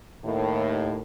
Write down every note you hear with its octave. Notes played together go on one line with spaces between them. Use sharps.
D#2 A2